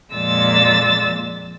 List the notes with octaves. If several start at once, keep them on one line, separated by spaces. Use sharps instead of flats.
F2 A#2 G#3 E6 A6